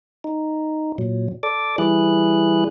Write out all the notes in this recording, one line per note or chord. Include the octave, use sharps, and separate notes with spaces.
D#4
A#2 F#3
A4 D5 D6
E3 G3 E4 G#4 F#6